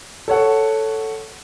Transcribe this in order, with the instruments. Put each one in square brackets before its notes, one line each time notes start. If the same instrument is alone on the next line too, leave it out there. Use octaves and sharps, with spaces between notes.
[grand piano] A4 C#5 F#5